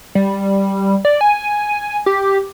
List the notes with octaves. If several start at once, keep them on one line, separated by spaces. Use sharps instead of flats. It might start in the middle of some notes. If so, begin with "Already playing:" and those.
G3
D5
G#5
G4